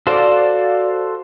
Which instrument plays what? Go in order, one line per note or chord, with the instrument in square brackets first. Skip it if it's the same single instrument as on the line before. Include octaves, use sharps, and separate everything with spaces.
[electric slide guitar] F#4 A4 C5 [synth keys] D5 F5